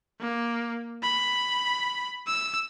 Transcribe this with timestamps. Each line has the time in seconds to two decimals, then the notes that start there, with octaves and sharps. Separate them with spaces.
0.20 A#3
1.02 B5
2.26 E6